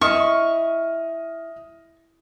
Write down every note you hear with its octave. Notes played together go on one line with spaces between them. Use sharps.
E4 D#5 C#6 D#6 F6